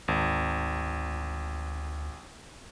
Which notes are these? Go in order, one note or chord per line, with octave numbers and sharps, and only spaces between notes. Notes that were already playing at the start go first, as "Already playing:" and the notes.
G#1 D2